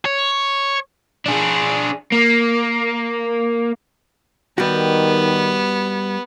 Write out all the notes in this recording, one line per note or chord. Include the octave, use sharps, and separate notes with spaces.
C#5
D4 G#4
A#3
D#3 G3 B3 F#4